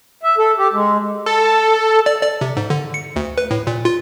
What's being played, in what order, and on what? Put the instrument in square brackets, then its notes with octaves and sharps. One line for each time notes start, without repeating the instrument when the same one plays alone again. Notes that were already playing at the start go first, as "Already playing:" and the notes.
[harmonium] E5
A4
G4
G#3
[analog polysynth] A4
[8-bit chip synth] D5
D5
C3
G#2
D3
C#7
D2
B4
A2
A#2
F4